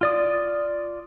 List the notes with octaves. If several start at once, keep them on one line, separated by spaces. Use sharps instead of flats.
F4 D5 D#6